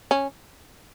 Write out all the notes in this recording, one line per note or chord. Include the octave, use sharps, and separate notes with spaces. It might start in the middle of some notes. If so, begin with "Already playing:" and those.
C#4